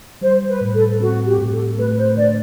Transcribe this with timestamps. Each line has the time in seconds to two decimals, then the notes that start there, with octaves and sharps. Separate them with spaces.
0.21 G3 C5
0.48 B4
0.61 A2
0.74 A4
1.00 C4 F#4
1.25 G4
1.38 A2
1.51 A4
1.77 A3 B4
1.97 C5
2.16 D3 D5